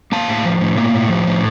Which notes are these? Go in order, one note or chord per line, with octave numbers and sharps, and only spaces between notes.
A#3 F5 A5
A2
F3
A2
A#3
A2
F3
A2